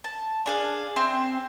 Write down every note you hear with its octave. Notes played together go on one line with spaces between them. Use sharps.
A5
D4 G#4 F5
C4 E5 C6